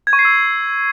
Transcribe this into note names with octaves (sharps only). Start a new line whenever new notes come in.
G#6
C#6
C7
E6